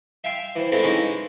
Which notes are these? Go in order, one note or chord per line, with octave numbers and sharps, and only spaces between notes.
E5 F5 G5 G#5 C6
E3 C5
G#3 A3 C4 E4 F4
E3 G#3 A#3 C#4 D#4 E4